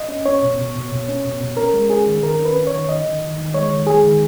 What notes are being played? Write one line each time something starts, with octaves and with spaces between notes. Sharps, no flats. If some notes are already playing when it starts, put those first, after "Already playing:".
Already playing: D#5
C#4
C#4 C#5
B2
B2
B2
B2
C#4
B2
B2
C#4 A#4
G#3
C#4 G#4
D#3
D#3 A#4
C#4
B4
C#4
C#5
D#3
D#3 D#5
D#3
D#3
D#3
G#3 C#5
D#3
G#3 G#4
D#3